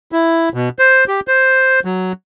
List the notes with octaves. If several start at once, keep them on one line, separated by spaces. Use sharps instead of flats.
E4
B2
C5
G4
C5
F#3